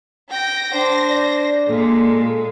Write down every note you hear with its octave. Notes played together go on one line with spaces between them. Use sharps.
G5 A#6
D4 C5
D5
A#2 G#3 A4